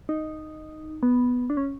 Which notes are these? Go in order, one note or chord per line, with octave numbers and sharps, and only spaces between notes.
D#4
B3
D4
C#4